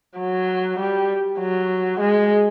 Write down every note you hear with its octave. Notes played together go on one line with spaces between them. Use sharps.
F#3
G3
F#3
G#3